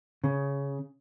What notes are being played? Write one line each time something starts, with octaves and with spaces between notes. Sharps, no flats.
C#3